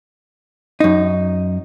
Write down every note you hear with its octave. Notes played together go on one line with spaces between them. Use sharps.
F#2 D#4